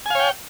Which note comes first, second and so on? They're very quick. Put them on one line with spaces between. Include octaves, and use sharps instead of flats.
G#5 F5 C#5 G5